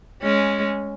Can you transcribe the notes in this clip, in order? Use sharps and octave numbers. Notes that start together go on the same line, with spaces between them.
G#3 C#4